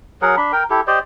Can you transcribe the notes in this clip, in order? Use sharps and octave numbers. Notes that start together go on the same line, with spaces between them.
F#3 G#4 A#4 F#5
D4 B5
A#4 G5
E4 G4 A4
G4 C5 D5 D#5